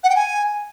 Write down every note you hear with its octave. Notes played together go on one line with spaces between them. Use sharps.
F#5
G5
G#5